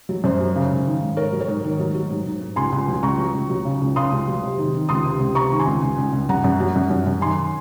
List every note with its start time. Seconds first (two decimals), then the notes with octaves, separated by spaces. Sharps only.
0.09 F#3
0.24 F#2 C5
0.39 F#3
0.55 C#3
0.71 G#2
0.86 D#3
1.02 G#2
1.17 G#2 A#4 C#5
1.32 F#3
1.40 A#4 C#5
1.48 G#2
1.64 D#3
1.80 F#3
1.94 F#3
2.10 G#2
2.26 G#2
2.42 G#2
2.56 C#2 G#5 C6
2.72 C#2
2.88 F#3
3.03 C#2 A#5 C#6
3.18 F#3
3.34 C#2
3.50 F#3
3.65 C#3
3.81 C#2
3.96 C#3 C6 D#6
4.12 C#2
4.28 F#3
4.43 C3
4.58 D#3
4.74 D#3
4.89 C#2 C6 D#6
5.05 C3
5.20 C#2
5.35 C3 A#5 C#6
5.52 D#3
5.60 G#5 C6
5.67 C#2
5.83 C#2
5.98 C#2
6.13 C#2
6.29 F#2 F#5 A#5
6.44 F#2
6.60 F#3
6.76 F#2
6.91 F#2
7.07 F#2
7.21 D#3 G#5 C6